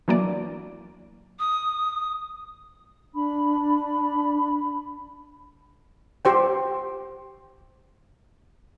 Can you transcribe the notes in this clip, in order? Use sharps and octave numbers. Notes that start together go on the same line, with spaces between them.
E3 F#3 A#3 D4 D5
D#6
D4 B5
G4 C5 G5